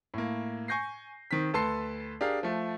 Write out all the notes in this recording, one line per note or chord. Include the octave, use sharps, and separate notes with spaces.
A2 A#3
G#5 C#6 G6 A#6 C7
D#3 C4 B6
D2 A4 B4 A5 C6 C7
D4 G4 G#4 A#4 F5
F3 A3